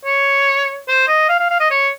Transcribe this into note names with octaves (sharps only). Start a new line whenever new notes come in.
C#5
C5
D#5
F5
F5
F5
D#5
C#5